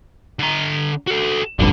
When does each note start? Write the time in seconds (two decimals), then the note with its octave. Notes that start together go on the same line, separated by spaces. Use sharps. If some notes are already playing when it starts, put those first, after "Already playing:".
0.39 D3 A#5
1.07 F#4 A4
1.59 F1 A#1 G2 D3